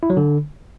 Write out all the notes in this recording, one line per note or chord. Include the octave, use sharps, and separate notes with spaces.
E4
F#3
D3